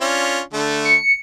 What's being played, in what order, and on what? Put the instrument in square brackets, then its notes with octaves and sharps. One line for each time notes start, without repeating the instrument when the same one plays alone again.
[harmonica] C#4 D4 F4
D3 A3
[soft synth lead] C#7